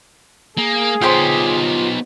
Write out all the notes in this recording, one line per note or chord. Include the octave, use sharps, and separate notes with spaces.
A#3 G#4
B3 D#4 F4 G4 C5 C#5 C6